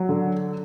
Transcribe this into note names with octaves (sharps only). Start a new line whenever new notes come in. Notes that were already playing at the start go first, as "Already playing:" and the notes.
Already playing: F#3
D3